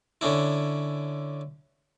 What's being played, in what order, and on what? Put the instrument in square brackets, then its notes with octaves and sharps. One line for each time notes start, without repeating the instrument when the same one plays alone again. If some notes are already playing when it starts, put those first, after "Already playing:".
[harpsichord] D3 C#4 D4 E4